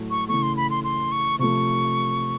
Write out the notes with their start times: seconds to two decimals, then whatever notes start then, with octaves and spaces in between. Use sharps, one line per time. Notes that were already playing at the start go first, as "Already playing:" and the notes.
Already playing: A2 F#3 A3
0.11 C#6
0.28 C#3 E3 A3 C#6
0.43 C6
0.57 B5
0.70 C6
0.84 C6
1.12 C#6
1.39 C3 F3 A3 C#6